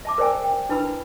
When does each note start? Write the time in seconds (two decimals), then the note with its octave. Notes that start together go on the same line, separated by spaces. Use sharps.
0.05 E5 A5 D6
0.18 A#4 C5 D5 G5 G#5
0.44 G5
0.69 D4 E4 B4 A5 B5 E6